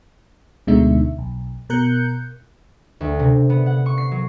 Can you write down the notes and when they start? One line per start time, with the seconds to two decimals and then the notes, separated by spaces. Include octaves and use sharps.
0.67 D2 B2 D3 G#3 D#4 E5
1.18 B1
1.69 B2 A#4 F#6 G6 C#7
3.01 D2
3.19 C3
3.50 B3
3.66 F#5
3.86 C#6
3.98 C7
4.12 F#3